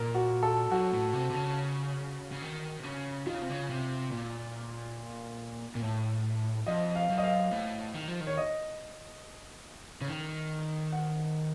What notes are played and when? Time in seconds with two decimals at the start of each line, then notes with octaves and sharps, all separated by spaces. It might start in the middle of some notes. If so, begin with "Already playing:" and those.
Already playing: A#2 A#4
0.15 F#4
0.43 A4
0.71 F#2 F#4
0.93 A2
1.14 C3
1.30 C3
1.35 C#3
2.32 C#3
2.42 D#3
2.80 C3
2.84 C#3
3.26 D#3 F4
3.34 C#3
3.42 C3
3.49 C#3
3.69 C3
4.11 A#2
5.75 A#2
5.82 A2
6.67 F2 D#5
6.96 F5
7.10 F#2
7.18 D#5
7.24 F5
7.52 A2
7.95 D#3
8.08 F3
8.21 D#3
8.27 C#5
8.37 D#5
10.01 C#3
10.07 D#3
10.93 F#5